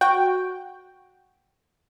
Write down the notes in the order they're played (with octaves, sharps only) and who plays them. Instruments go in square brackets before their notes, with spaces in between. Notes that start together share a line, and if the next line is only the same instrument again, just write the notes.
[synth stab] F#4 G5